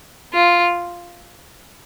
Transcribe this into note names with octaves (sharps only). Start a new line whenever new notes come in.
F4